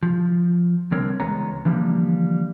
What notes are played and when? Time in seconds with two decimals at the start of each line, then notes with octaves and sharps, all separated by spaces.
0.03 F3
0.92 C2 D3 G3 C4 A#4 C#5
1.20 C#2 E3 G#3 B3 C#5 A#5
1.65 D3 E3 F3 G3 A3 A#3